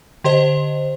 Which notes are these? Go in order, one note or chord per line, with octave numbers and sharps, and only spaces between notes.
D3 G4 C5 D#5